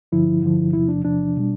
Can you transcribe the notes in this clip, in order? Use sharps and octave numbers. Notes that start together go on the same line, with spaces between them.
G2 D3 F3 E4
G2 D3 F3
E2 C3 F3 E4
D4
E2 C3 F3 D4
B2 G3